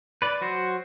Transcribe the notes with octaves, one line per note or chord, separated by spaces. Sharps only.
B4 D5
F#3 F#4 C5